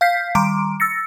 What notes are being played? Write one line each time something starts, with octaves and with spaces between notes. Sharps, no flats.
F5 F6 G6 B6 C7
D#3 G3 A#5 C6 D6 D7
E6 A6 A#6 C#7